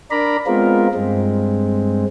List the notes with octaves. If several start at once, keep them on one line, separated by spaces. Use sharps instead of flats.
D4 A#4 D5 A#5 B5
G#3 B3 C4 F4 A#4
G2 G#3 C4